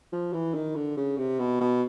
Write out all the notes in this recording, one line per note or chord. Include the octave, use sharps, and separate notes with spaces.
F3
E3
D#3
D3
C#3
C3
B2
B2